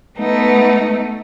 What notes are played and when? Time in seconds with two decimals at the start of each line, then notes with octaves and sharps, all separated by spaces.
0.19 A3 B3 D#4